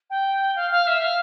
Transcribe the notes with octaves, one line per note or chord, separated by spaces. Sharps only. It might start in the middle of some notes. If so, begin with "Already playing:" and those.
G5
F5
F5
E5
F5